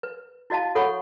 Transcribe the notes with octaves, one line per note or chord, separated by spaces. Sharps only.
B4
E4 F#4 D#5 F5 A5
F#4 A4 C#5 F#5 B5 C#6